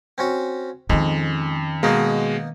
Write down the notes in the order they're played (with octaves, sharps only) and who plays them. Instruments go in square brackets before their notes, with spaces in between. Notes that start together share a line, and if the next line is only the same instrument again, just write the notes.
[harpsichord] C4 C#4 F#4
[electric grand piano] F2 [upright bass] D#3 C#4 [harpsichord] G#3
[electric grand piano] B2 G#3 [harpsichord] A#3 B3 D#4